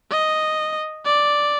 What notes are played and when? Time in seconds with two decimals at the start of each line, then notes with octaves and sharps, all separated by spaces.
0.11 D#5
1.05 D5